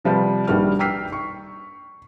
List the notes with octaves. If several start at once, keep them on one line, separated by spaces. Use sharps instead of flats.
C3 F3 G3 B4 C5
A#1 D#3 G3 F#4 B4 F6
G5 A#5 E6 F6 B6 C7
C#6